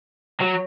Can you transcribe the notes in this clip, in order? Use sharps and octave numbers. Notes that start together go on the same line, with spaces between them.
F#3 C#5